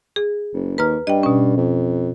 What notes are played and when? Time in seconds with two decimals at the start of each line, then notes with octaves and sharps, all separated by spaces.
0.16 G#4
0.53 F#1
0.78 D#2 B4 A#5 F6
1.07 G2 D#5 G5
1.23 B2 C#4
1.57 F2